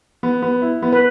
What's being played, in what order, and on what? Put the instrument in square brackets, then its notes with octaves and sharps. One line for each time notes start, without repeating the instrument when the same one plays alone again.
[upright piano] B3
B3
E4
B3
[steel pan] B4